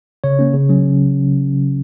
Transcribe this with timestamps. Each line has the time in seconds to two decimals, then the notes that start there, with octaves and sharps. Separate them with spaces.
0.24 C#3 C#5
0.39 A#3 C#4
0.54 C#3
0.69 F#3 C#4